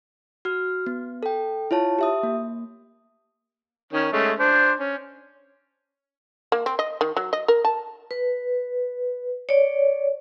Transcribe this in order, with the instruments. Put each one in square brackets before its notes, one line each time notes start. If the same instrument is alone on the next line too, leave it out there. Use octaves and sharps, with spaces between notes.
[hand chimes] F#4 F6
B3
A4 G5
E4 F4 C#5 A5
G4 E5 D#6
A#3
[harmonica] D#3 C#4
G#3 A3 C#4
D4 C5
C#4
[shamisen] A#3
C4
D#5
D#3
F#3
D#5
A#4
A5
[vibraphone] B4
C#5 D5